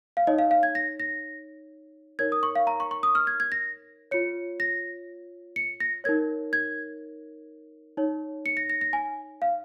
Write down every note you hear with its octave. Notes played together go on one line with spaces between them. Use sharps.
F5
D#4 C#5 D#5
F5
F5
G#6
A#6
A#6
D#4 A#4 C#5 G#6
D#6
C#6
F5
A#5
C#6
C#6
D#6
F6
G#6
G#6
A#6
F4 C#5 C#7
A#6
C#7
A#6
D#4 A#4 C#5 G#6
G#6
D#4 C#5
C#7
A#6
A#6
A#6
G#5
F5